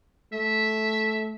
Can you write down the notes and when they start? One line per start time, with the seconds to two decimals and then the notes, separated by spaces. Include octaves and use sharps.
0.33 A3 E5